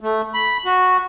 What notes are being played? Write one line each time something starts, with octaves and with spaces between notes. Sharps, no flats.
A3
B5
F#4